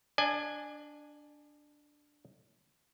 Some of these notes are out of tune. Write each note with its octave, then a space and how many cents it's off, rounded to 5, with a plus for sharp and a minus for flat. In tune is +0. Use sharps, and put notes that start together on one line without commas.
D4 +0 D5 +35 G#5 +0